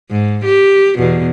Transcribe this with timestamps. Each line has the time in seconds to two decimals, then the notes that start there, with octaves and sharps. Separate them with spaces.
0.11 G#2
0.46 G4
0.98 E2 B2